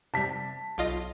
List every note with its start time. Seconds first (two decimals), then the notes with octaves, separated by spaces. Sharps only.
0.14 C3 G3 A5 B6
0.78 B1 F4 D#5